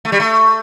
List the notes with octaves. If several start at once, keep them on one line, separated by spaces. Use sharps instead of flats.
A3
G3
A3